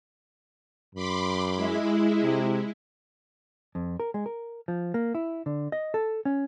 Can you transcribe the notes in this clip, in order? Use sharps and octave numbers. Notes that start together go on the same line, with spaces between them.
F#2 B5 C6 D6
G#3 E4
C3
F2
A#4
G#3
A#4
F3
A#3
E4
D3
D#5
A4
C#4